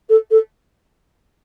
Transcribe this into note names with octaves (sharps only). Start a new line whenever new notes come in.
A4
A4